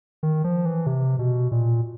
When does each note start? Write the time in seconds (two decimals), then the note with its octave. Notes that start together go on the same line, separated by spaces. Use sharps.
0.23 D#3
0.44 F3
0.65 E3
0.86 C3
1.19 B2
1.52 A#2